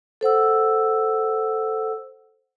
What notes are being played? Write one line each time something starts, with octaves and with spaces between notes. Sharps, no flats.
A4 C5 F#5 E6